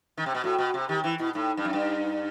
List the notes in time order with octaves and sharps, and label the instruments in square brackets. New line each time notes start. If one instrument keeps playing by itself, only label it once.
[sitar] D#3
C3
B2
[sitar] A2 [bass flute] F#4
[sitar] B2
C3
[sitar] D#3 [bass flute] G4
[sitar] E3 [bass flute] E4
[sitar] B2 [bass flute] E4
[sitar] A2 [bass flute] D#4
[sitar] G2
F#2
G2